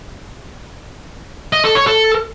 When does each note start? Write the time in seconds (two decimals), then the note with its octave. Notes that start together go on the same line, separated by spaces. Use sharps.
1.53 D#5
1.64 A4
1.75 C#5
1.87 A4